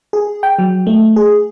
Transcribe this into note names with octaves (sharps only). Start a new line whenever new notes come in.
G#4
G5
F#3
A3
G#4